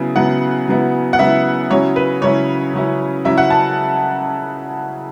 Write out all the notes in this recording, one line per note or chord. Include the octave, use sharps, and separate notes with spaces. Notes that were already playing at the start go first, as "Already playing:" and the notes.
Already playing: C#3 F#3 B3 E4
C#3 F#3 B3 E4 F#5
C#3 F#3 B3 E4
F#5
C#3 F#3 B3 E4 E5
C#3 F#3 C#4 E4 C#5
B4
C#3 F#3 C#4 E4 C#5
C#3 F#3 C#4 E4
C#3 F#3 C#4 E4 E5
F#5
A5